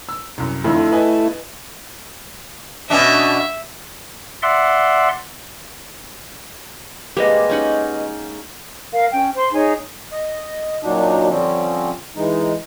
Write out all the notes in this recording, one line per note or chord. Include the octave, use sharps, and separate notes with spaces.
E6
C2 F#2
F2 D3 D#3 A3 E4
B4 D#5 G#5
B2 C#4 D4 E5
D5 E5 F#5 C6
G3 G#3 A#3 G4 B4 D#5
C#4 D#4 F#5
A#4 F5
C#4 G5
C5 C6
D#4 G#4 C#5 G#5
D#5
F#2 A#2 F#3 D4 D#4
D3 F3 G3 C4 C#4
E3 G#3 D#4